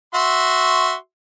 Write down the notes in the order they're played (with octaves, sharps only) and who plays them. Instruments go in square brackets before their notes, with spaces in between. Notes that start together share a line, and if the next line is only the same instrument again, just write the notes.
[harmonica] F#4 E5 C6